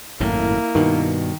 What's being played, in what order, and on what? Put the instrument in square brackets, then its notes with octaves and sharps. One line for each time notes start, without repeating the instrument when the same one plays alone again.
[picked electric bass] G#1 F#2 A2 [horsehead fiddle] A#3 E4
[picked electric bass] G2 B2 [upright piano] D#3